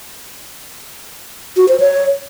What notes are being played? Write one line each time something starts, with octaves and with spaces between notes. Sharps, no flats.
F#4
C5
C#5